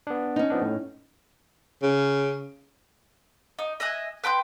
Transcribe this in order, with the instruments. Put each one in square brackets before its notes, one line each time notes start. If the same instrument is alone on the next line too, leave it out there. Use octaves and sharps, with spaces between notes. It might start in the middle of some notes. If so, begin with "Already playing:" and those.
[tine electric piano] B3 D4
[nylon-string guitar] C#4 D#4
[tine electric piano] F3 B3 D4
A2
[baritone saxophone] C#3
[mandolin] D#4
D#5 E5 G#5 F#6
B4 G5 C6 G6